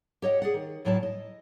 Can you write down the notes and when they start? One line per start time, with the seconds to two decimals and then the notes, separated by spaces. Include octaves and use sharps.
0.22 G4 C#5 D#5 F#5
0.42 G#4 D5 F#5
0.54 D#3
0.85 D2 A2 F#3 E4 G#5 A5
1.03 D#5